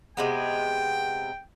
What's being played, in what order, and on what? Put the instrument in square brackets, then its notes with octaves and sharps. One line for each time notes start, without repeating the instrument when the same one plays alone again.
[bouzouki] C3 G#3 B3 [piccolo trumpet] G5